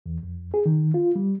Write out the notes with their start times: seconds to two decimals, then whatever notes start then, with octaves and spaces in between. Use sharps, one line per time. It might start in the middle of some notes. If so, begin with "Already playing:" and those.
0.06 E2
0.23 F2
0.54 G#4
0.66 D#3
0.94 F4
1.15 G3